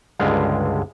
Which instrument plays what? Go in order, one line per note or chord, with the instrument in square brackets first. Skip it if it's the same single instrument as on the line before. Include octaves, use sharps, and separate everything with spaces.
[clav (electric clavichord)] C#2 G2 D3 G#3 F5